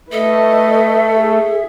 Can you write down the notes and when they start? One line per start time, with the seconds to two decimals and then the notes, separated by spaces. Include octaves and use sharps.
0.12 A3 A4 B4 D#5 E5
1.17 G#4